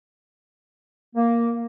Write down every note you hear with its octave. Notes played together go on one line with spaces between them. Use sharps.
A#3